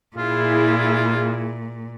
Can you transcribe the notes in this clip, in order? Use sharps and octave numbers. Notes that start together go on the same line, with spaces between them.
A#2 E4 F4 G#4